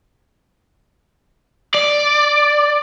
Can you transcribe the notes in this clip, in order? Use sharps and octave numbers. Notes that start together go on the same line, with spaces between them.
D5